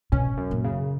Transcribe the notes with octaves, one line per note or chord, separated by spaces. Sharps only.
B2 C#4
F#2
A#2
C#3